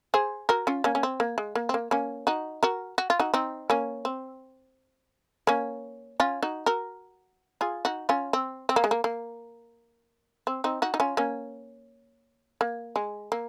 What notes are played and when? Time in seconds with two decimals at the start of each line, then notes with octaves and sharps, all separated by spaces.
0.14 G#4 C5
0.49 F#4 A#4
0.67 C#4 F4
0.84 A#3 C#4
0.95 C#4
1.03 C4
1.20 A#3
1.38 G#3
1.55 A#3
1.69 C4
1.74 A#3
1.91 A#3 C#4
2.27 D#4 F#4
2.63 F#4 A#4
2.98 F#4
3.10 F4
3.19 D#4 F#4
3.34 C4 D#4
3.70 A#3 C#4
4.05 C4
5.47 A#3 C#4
6.20 C#4 F4
6.43 D#4 F#4
6.66 F#4 A#4
7.61 F4 G#4
7.85 D#4 F#4
8.09 C#4 F4
8.33 C4
8.69 C4
8.76 A#3
8.84 G#3
8.91 A#3
9.04 A#3
10.47 C4
10.64 C4 D#4
10.82 D#4 F#4
10.94 D#4
11.00 C#4 F4
11.17 A#3 C#4
12.61 A#3
12.96 G#3
13.32 A#3